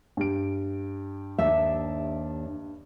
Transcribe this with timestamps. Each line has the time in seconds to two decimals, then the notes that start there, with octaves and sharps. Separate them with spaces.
0.17 G2 G4 D7
1.38 D#2 D4 E5